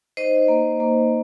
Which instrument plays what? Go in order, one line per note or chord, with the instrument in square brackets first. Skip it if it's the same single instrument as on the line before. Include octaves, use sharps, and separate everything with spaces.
[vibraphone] D#4 C5 D#5
A#3
A#3